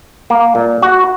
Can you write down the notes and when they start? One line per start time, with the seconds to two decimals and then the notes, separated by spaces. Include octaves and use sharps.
0.30 A#3
0.55 A#2
0.82 F#4